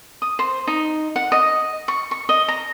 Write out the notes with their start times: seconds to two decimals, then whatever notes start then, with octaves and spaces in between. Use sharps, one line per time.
0.22 D#6
0.39 C5
0.67 D#4
1.16 F#5
1.32 D#5
1.88 C#6
2.11 C#6
2.29 D#5
2.48 A#5